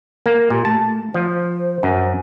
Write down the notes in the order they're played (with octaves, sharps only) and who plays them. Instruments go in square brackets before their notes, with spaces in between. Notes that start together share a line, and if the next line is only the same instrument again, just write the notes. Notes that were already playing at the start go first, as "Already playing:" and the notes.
[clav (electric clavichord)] A#3
[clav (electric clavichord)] A#2 [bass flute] G4
[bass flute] A3 [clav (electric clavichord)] A5
[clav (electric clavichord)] F3 [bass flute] C5
[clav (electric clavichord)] F#2